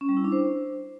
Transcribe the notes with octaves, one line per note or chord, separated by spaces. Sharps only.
C#4
G3
E4
D4
C5